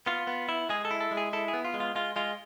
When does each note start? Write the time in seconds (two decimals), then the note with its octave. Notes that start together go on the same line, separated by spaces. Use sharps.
0.06 B3 F4
0.27 B3
0.49 E4
0.69 G#3 G#4
0.85 A4
0.91 E4
1.01 A4
1.11 G#3
1.17 G#4
1.33 E4 A4
1.48 G#4
1.54 B3
1.65 F4
1.74 G#3
1.80 F4
1.95 G#3 F4
2.16 G#3 F4